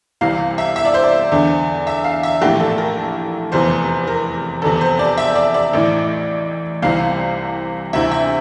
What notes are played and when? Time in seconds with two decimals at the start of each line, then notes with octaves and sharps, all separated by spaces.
0.21 C2 C3 E3 F5
0.58 E5
0.76 E5
0.85 D5
0.94 C5
1.04 D5
1.32 E2 D3
1.87 E5
2.04 F5
2.23 E5
2.41 A#1 A2 E3 G4
2.60 A4
2.78 A#4
3.52 F1 E2 C3 E3 C5
4.07 A#4
4.62 F1 E2 C3 A4
4.81 C5
4.99 D5
5.18 E5
5.35 D5
5.54 D5
5.73 A1 A2 E3
6.82 C2 C3 E3 F5
7.93 D2 C3 E3 E5
8.11 E5